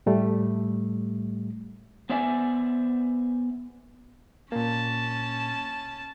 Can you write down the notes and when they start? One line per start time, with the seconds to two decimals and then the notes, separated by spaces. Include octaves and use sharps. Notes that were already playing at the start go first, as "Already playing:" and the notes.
0.06 A2 G3 A3
2.09 B3 C5 D5 E5 G#5
4.52 A#2 A#3 C#4 A5